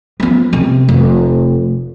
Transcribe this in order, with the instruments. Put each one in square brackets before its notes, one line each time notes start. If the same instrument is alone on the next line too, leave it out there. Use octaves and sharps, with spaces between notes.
[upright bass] F3 B3
C3
F1